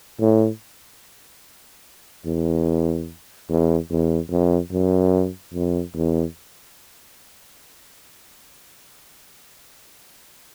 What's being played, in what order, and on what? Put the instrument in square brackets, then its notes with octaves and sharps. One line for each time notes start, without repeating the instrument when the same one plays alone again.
[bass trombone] A2
E2
E2
E2
F2
F#2
F2
E2